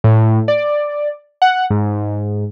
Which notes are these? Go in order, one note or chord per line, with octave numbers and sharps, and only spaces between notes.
A2
D5
F#5
G#2